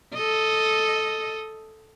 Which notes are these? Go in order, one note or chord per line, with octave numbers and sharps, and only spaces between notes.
A4 D#5